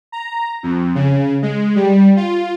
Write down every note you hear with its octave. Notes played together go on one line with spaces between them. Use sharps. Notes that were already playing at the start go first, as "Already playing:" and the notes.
A#5
F2
C#3
G#3
G3
F4